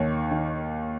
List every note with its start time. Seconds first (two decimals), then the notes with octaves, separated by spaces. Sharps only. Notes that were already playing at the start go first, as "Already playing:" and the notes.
Already playing: D#2 D#3 C#5
0.31 D#3